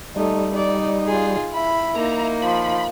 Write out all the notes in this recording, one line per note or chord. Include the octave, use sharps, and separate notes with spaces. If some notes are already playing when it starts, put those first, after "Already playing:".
G3 A3 D#4
D#4 D5
F4 G#4
E4 B5
A#3 D#4 A#5
F3 B5